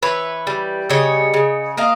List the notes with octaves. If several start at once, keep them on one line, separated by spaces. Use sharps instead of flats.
E3 B4 C#5
G3
C#3 C#5 D#5
C#3
A#3 D#5 F5